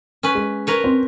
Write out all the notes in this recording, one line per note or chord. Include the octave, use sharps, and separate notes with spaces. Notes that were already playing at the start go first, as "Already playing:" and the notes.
C#4 B4
G#3
A#4 B4 C#5
C4